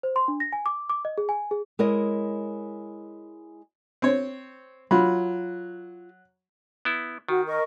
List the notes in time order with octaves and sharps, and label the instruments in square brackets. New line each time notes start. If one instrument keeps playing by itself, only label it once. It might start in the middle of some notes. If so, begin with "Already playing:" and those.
[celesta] C5
C6
D4
A#6
G#5
D6
D6
D#5
G#4
G#5
G#4
[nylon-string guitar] G#3 E4 A#4 C#5 D#5
[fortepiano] C4 C#5
[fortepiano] F#3 [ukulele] F4 B5
[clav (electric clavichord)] B3 E4
[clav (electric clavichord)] D#3 [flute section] F#4
[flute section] A#4 D#5 C#6